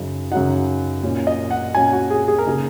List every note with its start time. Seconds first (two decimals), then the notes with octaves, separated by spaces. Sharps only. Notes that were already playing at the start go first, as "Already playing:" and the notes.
Already playing: F#2 C#3 F#3 D#4
0.31 F#2 C#3 F#3 D#4 F#5
1.03 A#2 F#3 C#4
1.27 D#5
1.51 F#5
1.74 A#2 F#3 C#4 G#5
1.92 F#4
2.10 G#4
2.28 G#4
2.38 A#4
2.46 C#3 A#3 D#4 G#4